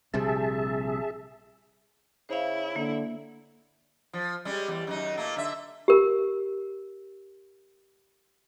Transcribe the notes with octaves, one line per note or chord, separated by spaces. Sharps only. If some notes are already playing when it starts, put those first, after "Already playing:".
A#1 C3 G3 G#4 E5 A5
C#3 E4 C5 F5
D3 A#3
F3
G3 G#3 C#4
E2 G3
F#2 D#3 D#4
A#2 A3 A#3
D3 E5
G4 A#4